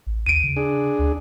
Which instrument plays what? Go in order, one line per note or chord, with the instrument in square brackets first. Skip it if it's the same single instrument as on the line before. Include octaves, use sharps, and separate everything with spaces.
[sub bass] A1
[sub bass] D#2 [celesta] D7 D#7
[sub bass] C#3
[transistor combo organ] D4 G#4
[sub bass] D2